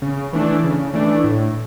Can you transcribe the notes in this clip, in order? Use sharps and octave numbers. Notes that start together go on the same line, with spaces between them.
C#3
E3 A3 D4
C#3
E3 A3 D4
A2